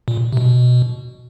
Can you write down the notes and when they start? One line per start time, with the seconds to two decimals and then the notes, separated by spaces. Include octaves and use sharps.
0.08 A#2
0.33 C3
0.37 B2